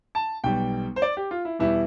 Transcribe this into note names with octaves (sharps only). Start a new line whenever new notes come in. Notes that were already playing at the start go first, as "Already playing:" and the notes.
A5
B1 B2 G3 G5
C5
D5
G4
F4
E4
E2 B2 G3 E4